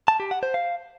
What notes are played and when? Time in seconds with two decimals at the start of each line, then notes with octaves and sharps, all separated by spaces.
0.08 A5
0.20 G4
0.31 F#5
0.43 C5
0.54 F5